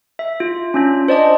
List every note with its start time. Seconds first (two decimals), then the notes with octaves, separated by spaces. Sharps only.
0.19 E5
0.40 F4
0.74 C#4 D4 F4
1.08 C5 D5 D#5 A5